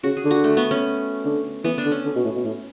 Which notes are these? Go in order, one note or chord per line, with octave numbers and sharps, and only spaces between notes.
C#3 F#4
G#4
D3
F#4
A3
B3
C#4
D3
E3 B3
D4
D3
C#4
D3
B2
A2
B2
A2